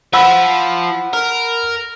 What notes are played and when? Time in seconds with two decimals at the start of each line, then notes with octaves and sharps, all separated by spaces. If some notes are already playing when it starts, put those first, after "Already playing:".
0.13 F3 F#5 B5 E6
1.14 A#4